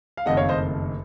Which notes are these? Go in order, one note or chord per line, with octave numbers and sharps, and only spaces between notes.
F5
F#1 F2 D#3 A3 D#5 F#5
C#5 F5
C5 D#5